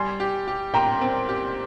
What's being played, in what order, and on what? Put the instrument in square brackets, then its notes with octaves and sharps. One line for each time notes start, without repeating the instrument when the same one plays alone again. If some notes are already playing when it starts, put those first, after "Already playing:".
Already playing: [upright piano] G3 [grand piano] G#5 C6
[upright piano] G4
G4
[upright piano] A#2 [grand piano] G5 A#5
[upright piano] C4
G4